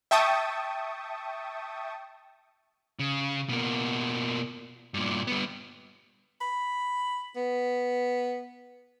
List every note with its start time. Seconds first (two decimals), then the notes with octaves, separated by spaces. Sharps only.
0.11 E5 G5 A5 C#6 D#6
2.99 C#3
3.49 B2 A#3
4.94 G2 A#2
5.27 G3 B3
6.41 B5
7.36 B3